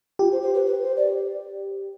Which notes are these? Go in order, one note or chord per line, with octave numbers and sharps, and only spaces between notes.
F4 G4
C5
C5
B4
B4
C5
D5